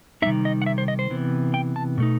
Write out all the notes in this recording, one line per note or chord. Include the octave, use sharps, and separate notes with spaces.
C3 D#3 G3 C4 D#4 E5
D#5
F#5
E5
C5
D#5
C5
C3 E3 B3
G5
A5
B2 A3 D#4